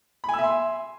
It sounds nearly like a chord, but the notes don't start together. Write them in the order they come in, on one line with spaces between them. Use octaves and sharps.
B5 G#5 E6 E5 C6